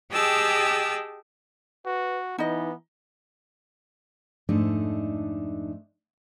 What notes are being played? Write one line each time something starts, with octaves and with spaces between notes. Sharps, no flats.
G4 G#4 D#5 G5 A5 E6
F#4 B4
E3 B3 D#4 D#5
F2 G#2 A3 D4 D#4